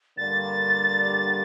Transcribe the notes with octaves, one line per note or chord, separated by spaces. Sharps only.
G2 D3 G3 A#3 D4 A6